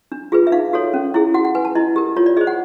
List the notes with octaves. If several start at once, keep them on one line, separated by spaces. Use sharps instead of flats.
D4
F4 G#4 B4
E5
D#4 F5
F#4 A4 C#5
C#4
E4 G#4
F#4 F#5
F#5
B4 G#5
A5
E4 D#5
G4 A#4
F4 C#5
D5
G#4 C5 D#5
F#5